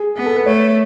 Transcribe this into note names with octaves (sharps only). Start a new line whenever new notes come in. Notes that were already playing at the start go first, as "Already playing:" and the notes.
Already playing: G#4
B3
A4
B4
A3 C#5